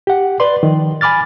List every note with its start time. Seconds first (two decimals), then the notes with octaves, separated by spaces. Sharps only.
0.07 G4 F#5
0.40 B4 D5 C6
0.63 D#3 F3
1.01 G#5 B5 D6 F6 A6